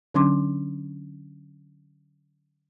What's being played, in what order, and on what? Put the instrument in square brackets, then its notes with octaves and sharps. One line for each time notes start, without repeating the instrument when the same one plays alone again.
[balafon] D3 F#3 C#4 D4 C6 D6